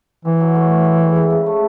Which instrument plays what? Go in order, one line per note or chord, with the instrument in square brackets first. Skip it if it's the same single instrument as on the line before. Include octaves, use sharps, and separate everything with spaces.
[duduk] E3 [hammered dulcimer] C4
[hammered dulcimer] F#3
A2
A2
C4
G#3
E4
C#3
A3